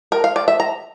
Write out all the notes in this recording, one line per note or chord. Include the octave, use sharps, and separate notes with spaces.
A#4
F5
D5
E5
A#5